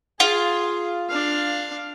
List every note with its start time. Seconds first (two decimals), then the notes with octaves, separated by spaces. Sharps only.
0.20 F4 G#4
1.10 D4 F5